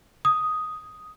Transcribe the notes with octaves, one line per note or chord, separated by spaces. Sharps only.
D#6